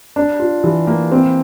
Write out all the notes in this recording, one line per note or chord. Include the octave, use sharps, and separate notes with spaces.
D4
F4
E3
A#3
C4